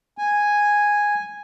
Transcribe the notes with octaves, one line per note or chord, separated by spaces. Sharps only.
G#5